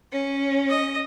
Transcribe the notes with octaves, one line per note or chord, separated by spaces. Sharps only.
C#4
D#5